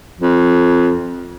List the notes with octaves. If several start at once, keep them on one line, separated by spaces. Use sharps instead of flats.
F2